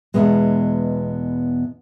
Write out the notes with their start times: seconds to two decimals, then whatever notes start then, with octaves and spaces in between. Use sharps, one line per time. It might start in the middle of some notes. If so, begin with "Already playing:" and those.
0.14 E2 B2 G#3 B3